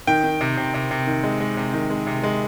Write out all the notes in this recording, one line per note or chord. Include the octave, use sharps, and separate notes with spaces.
D#3 G5
D#3
C3
C3
C3
C3
D#3
G#3
G#3
C3
D#3
G#3
C3
G#3